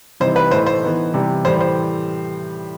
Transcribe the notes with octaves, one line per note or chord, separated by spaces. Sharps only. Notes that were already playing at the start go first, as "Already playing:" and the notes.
C3 E3 G3 D#4 C5
B4
A2 E3 A3 D#4 C5
C5
E3 B3 D#4
C3 E3 G3
A2 E3 G3 C5
C5